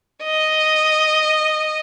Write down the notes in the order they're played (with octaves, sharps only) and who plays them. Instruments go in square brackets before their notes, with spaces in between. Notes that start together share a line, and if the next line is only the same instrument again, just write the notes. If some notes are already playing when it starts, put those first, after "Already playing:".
[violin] D#5